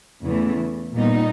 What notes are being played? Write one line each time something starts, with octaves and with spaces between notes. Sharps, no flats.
E2 C#3 E3 A3
A#2 G3 B3 D#4